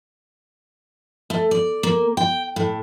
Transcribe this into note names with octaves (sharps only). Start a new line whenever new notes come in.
A3
D5
A#3
G5
A2